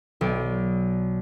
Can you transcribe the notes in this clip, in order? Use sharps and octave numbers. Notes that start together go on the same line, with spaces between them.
B1 D5